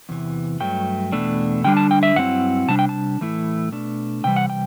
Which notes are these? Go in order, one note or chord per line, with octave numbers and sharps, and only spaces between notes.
E2 C3 E3
G2 F#3 A3 G5
E2 B2 A3 D4
D3 G3 D4 G5
A5
G5
E5
G2 F#3 C4 E4 F#5
C3 G3 D4 A5
G5
A5
A2 E3 A3 E4
B2 A3 D4
C3 E3 G3 G5
F#5
G5